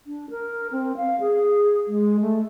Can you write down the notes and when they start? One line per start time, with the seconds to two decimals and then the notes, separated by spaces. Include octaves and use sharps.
0.06 D4
0.30 A#4
0.72 C4
0.97 F5
1.21 G#4
1.88 G#3
2.21 A3